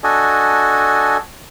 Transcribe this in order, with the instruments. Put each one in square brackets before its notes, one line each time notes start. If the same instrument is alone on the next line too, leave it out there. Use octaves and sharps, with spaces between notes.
[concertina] D4 F#4 A4 D#5 G#5